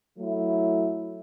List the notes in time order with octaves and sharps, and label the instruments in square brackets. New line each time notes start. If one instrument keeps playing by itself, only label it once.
[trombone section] F#3 A3 E4